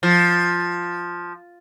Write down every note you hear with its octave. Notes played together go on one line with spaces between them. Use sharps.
F3